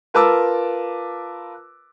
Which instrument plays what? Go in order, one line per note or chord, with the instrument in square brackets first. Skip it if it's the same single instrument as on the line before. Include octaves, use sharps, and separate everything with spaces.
[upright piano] F4 A#4 B4 A5 D6 E6